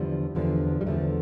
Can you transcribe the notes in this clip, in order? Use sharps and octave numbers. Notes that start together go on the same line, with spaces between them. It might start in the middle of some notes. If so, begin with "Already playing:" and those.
Already playing: E2 D3 F3 G3
E2 D3 F3
G3
E2 D3 F3 A3